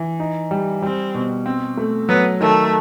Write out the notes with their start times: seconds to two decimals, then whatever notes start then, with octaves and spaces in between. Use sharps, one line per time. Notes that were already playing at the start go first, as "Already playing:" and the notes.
Already playing: E3
0.20 D#4
0.51 G3
0.82 G3 C4
1.14 B2
1.46 C4
1.77 A3
2.09 F#3 B3
2.41 D#3 A3